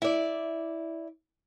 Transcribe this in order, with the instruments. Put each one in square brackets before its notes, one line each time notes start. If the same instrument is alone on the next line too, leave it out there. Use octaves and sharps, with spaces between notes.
[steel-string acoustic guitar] E4 D5